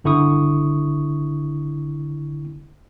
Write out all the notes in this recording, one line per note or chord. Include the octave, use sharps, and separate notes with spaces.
G1 D3 E4 C#6 D#6